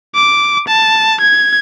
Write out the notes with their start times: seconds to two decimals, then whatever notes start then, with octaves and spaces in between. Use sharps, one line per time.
0.15 D6
0.68 A5
1.20 G#6